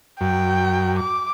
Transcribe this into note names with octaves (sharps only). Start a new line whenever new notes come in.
F#2 G5
D6